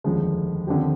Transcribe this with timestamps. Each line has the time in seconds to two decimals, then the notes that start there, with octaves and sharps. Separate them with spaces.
0.04 F1 D#2 D3 F3 G#3
0.67 D#2 D3 F3 C4 G4